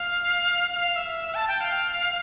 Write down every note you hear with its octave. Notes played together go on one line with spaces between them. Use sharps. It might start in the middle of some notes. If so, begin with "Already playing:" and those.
Already playing: F5
F5
E5
A5
G5
F5